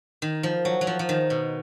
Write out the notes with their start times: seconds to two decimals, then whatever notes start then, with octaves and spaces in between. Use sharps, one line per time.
0.22 D#3
0.43 F3
0.65 F#3
0.81 F#3
0.87 F3
0.99 F3
1.09 D#3
1.30 B2